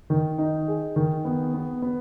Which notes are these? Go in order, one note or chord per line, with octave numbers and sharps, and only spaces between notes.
D#3
D#4
G#4
D#3
B3
B3
B3